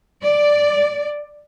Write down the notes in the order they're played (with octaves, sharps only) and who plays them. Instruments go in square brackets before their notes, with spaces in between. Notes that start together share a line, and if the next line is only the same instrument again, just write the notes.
[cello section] D5